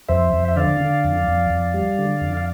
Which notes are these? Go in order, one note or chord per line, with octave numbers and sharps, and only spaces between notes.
F2 C5 E5
F2
E5
D3 D5 F5
D3
F2
F2
F2
G3
D3
F2
F5